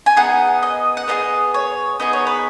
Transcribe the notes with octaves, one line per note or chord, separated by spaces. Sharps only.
G#5
B3 D#4 G#4 F#5
D#5
F#5
B3 D#4 G#4 D#5
C#5
B3 D#4 G#4 D#5
C#5
B4